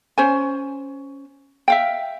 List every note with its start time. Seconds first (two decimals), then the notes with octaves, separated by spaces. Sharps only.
0.18 C#4 C5 G#5
1.68 E5 F5 G5